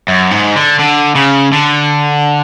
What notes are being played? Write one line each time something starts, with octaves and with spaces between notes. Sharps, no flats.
F#2
G#2
D3
D3
C#3
D3